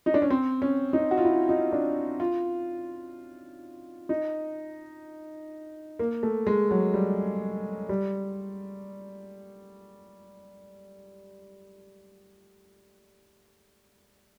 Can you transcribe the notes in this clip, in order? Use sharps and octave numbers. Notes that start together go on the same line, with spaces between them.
D#4
D4
C#4
C4
C#4
D#4
F#4
F4
E4
D#4
D4
F4
D#4
A#3
A3
G#3
F#3
G3
G3